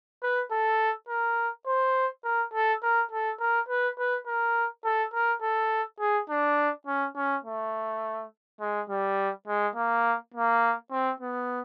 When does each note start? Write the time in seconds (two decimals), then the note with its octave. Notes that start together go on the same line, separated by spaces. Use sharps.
0.23 B4
0.51 A4
1.09 A#4
1.67 C5
2.24 A#4
2.54 A4
2.83 A#4
3.12 A4
3.40 A#4
3.69 B4
3.99 B4
4.26 A#4
4.84 A4
5.13 A#4
5.42 A4
6.00 G#4
6.30 D4
6.87 C#4
7.16 C#4
7.44 A3
8.61 G#3
8.90 G3
9.48 G#3
9.75 A#3
10.34 A#3
10.91 C4
11.20 B3